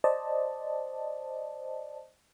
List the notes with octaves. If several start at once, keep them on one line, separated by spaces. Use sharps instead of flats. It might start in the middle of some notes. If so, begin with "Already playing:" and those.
C5 D5 D#5 A5